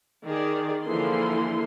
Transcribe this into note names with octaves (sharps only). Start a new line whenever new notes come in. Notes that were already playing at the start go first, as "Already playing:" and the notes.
D#3 G#4 D5
D3 E3 F3 A#3 G#4 C6